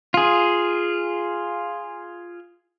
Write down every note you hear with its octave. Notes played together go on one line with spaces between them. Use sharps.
F4 G#4